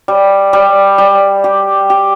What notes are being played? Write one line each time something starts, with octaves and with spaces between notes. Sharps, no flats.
G3
G3
G3
G4
G4